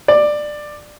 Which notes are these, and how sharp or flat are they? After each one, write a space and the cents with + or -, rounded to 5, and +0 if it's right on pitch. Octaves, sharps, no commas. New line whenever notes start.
D5 +15